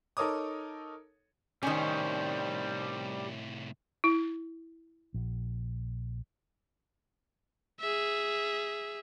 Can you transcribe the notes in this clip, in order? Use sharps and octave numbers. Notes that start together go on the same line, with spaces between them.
D#4 A4 A#4 C#5 D6 D#6
A2 C3 D#3 G3 C#4 C5
E4
A#1
G#4 E5